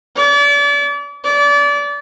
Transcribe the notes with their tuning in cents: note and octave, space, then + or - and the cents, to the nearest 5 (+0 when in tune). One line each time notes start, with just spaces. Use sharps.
D5 -35
D5 -30